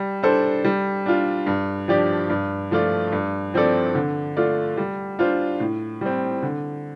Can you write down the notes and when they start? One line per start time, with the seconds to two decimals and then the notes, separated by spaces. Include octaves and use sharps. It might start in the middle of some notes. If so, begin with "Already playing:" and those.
Already playing: G3
0.23 D4 A4 C5
0.64 G3
1.06 D4 F4
1.46 G2
1.88 F3 D4 G4 D5
2.30 G2
2.71 F3 A3 F4 D5
3.12 G2
3.54 F3 C4 A4 D5
3.95 D3
4.37 A3 F4 D5
4.77 G3
5.19 D4 F4 C5
5.60 A2
6.01 G3 C4
6.42 D3